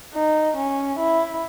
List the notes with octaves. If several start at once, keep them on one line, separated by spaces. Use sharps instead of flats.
D#4
C#4
E4